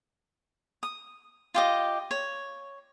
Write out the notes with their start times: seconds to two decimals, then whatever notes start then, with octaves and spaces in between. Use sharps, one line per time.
0.83 D#6
1.54 F4 G4 D#5
2.11 C#5